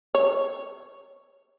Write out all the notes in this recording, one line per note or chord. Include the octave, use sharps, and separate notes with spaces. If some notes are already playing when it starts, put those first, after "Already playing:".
C#5